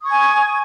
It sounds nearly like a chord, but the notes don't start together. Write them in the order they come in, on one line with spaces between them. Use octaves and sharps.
D#6 C#6 G#6 G#5